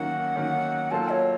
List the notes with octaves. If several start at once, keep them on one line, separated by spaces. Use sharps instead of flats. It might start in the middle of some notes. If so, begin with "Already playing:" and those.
Already playing: D#3 F#3 A#3 C#4 F#4 F#5
D#3 F#3 A#3 C#4 F#4
F#3 A#3 F4 A4 C5 A5
C#5